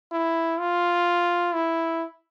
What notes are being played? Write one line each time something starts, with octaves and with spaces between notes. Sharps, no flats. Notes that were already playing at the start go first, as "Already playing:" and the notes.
E4
F4
E4